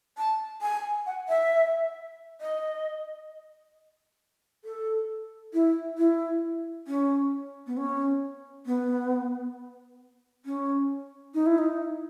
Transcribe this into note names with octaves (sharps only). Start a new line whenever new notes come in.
A5
G#5
F#5
E5
D#5
A4
E4
E4
C#4
B3
C#4
B3
C#4
D#4
E4
D#4